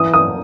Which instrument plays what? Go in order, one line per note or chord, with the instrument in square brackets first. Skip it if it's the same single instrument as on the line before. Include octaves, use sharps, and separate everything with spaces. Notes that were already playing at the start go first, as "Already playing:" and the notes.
Already playing: [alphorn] E3 [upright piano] D#6
[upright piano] D#6